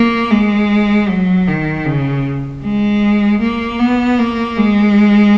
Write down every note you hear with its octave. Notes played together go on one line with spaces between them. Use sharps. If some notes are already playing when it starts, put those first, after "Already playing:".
Already playing: A#3
G#3
F#3
D#3
C#3
G#3
A#3
B3
A#3
G#3